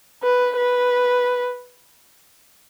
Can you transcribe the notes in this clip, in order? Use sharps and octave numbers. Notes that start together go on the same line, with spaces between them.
B4
B4